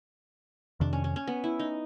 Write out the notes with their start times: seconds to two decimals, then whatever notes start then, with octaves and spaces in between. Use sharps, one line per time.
0.80 F2 C3 D#3 D4
0.93 C#4
1.04 C#4
1.16 C#4
1.27 B3
1.44 E4
1.59 D#4